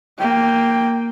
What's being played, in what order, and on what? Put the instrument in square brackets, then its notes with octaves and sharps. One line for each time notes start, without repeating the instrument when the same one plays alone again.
[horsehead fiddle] A#3 G5